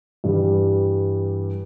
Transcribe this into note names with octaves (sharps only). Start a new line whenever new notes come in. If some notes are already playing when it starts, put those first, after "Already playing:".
G2 E3 G3